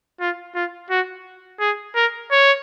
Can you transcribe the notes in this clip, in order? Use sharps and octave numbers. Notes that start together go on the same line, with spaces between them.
F4
F4
F#4
G#4
A#4
C#5